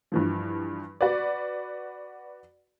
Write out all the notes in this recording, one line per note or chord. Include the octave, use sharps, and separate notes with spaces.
G2 E3 F3
F#4 B4 D5